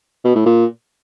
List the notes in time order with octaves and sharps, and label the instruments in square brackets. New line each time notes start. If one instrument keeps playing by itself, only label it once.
[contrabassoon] B2
A2
A#2